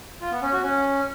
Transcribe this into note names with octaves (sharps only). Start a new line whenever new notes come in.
F4
B3
C#4
F#4
C#4